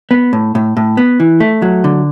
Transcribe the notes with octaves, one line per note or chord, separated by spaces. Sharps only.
B3
A2
A2
A2
B3
E3
A3
F#3
D3